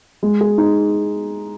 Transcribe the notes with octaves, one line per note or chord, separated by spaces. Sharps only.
G#3
G#4
D#4